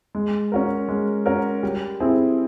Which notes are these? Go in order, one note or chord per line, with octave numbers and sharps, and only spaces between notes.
G#3
C#4 F#4 A#4
G#3
C#4 F#4 A#4
G3
C4 E4 G#4